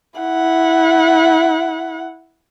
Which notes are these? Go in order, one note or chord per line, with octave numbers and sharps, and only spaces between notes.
E4 F#5